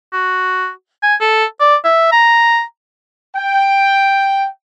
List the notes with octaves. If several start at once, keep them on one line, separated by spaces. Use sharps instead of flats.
F#4
G#5
A4
D5
E5
A#5
G5